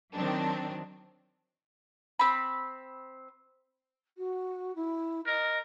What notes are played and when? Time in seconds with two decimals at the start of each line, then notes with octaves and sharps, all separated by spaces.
0.15 D#3 F#3 C4 D4
2.19 C4 B5
4.18 F#4
4.75 E4
5.27 A#4 D#5